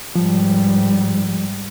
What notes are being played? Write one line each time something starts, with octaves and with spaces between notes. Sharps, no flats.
G#2 F3 G3